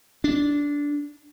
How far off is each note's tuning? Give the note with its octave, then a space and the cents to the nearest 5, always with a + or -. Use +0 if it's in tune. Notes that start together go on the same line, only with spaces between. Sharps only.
D4 -15